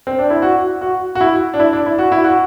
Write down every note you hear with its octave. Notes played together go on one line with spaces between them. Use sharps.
C4
D4
E4
F#4
F#4
F#4
E4
D4
E4
D4
E4
F#4
E4
F#4